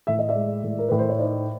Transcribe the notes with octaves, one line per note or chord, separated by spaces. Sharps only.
A2 E5
D#5
D5 E5
G#3
A2
A#4
A2 B4
C5
C#5
D#4 C5 D5